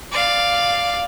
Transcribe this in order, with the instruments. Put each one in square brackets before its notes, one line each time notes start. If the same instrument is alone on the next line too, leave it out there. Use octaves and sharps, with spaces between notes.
[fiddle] D5 F5